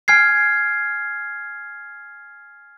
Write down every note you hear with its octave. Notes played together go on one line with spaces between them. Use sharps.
G#5 F6 G#6 C7